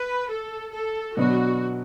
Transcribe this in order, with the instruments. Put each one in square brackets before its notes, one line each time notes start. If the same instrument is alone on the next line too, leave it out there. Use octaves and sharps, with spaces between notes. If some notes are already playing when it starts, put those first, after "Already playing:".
Already playing: [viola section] B4
A4
A4
[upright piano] B2 F#3 B3 D4 [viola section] F#4